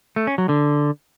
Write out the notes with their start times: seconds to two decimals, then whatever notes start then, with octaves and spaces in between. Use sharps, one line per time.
0.16 A3
0.27 C#4
0.38 F#3
0.49 D3